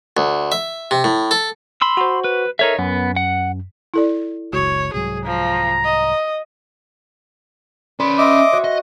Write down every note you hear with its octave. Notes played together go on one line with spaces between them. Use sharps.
D2
E5
C3
A2
A4
B5 C6 E6
F#4 C5
B4
D#4 A4 A#4 C#5 E5
F#2 B3
F#5
E4 A4 D5
F#1 C#2 F#4 C#5
C2 G#2 F#3 G#4
F3 A#5
D#5
C#4 B4 D5 B5 C6
D#5 E5 C6 D6
F#4 C#5
D#5